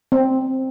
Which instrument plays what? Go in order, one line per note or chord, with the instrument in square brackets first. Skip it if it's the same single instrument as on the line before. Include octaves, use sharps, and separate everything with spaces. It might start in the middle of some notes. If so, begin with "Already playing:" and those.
[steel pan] C4